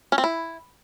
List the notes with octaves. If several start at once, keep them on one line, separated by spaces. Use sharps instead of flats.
C#4
C4
E4